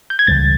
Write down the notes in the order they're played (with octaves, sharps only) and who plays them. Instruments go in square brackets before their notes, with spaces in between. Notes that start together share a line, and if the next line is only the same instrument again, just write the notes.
[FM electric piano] G6
G#6
[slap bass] C#2 C#3 E3 G3 [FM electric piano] A6